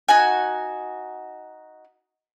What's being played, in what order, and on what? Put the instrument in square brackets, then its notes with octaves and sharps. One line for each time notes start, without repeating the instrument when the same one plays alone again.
[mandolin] D#4 F#4 G#5